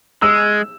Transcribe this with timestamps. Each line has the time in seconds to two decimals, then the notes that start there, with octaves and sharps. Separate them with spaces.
0.22 G#3 E6